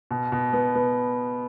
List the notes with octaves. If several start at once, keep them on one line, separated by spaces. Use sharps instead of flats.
B2
B2
B3
B3